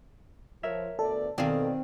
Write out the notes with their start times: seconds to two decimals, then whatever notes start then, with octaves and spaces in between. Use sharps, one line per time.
0.63 F3 A#4 C#5 E5
0.99 D2 B3 A4 D5
1.38 B2 D#3 C4 G#4 D5 F5